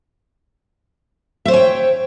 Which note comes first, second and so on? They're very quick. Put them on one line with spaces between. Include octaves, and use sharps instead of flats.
E5 C5 C#5 G#5 G5